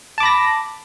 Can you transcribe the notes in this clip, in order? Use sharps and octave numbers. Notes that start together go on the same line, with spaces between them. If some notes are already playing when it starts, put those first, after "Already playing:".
A5 B5 D6 A#6